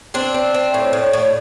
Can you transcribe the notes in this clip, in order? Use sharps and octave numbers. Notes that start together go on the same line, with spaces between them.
C4 D4
C4
C4
A2
A2
A2